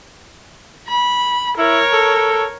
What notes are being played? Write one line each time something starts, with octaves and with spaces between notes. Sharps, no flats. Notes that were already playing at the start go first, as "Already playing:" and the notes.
B5
E4 A#4 C#5
A4